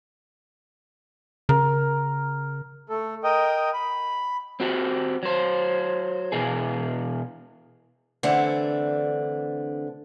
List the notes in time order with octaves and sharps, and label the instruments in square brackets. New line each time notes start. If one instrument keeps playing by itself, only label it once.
[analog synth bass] C#3 [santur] A#4
[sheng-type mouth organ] A3 A4
A#4 D#5 G5 D#6
B5
[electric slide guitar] C4 F#4 G4
F#3 C5
B2 E3 G#4
[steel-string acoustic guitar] D3 E3 A3 C4 D4